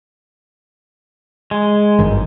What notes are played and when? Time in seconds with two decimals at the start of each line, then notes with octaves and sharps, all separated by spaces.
1.51 G#3
1.99 G#1 G2 D#3